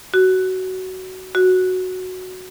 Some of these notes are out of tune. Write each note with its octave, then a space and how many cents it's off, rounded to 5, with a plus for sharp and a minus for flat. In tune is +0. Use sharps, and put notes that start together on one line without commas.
F#4 +15
F#4 +0